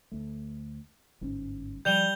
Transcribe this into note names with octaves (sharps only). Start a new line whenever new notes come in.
D2 A3
G1 G#2 C#4
F3 G3 G6 F7 G7